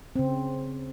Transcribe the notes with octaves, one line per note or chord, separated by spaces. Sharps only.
C#3 C4